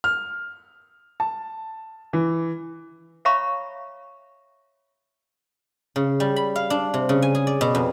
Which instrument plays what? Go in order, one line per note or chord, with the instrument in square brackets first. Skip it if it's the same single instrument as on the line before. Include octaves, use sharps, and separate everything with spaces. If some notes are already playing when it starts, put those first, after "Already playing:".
[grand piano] F6
A5
E3
[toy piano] C#5 E5 F5 A#5 B5 C#6
[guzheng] C#3
G3
B5
F5
D4
C3
C#3
G#5
G#4
D5
B2
F2